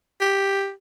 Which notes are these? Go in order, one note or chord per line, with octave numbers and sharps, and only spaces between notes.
G4